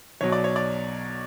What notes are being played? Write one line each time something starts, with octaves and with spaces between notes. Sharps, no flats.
B1 B2 F#3 C#5
D5
C#5
D5